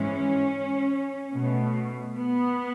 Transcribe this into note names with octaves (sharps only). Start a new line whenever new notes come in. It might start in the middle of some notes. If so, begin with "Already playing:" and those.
Already playing: G#2 E3 G#3 C#4
B2 A3
B3